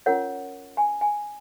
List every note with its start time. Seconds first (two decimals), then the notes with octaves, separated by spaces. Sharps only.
0.06 C#4 F4 A#4 C#5 F#5
0.77 G#5
1.01 G#5